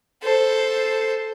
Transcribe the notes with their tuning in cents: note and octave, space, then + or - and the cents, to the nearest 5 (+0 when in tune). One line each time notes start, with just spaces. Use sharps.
A4 +0 C5 +0